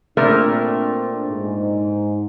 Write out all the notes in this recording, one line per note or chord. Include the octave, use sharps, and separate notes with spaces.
A#2 A3 C4 D4 A#4
G#2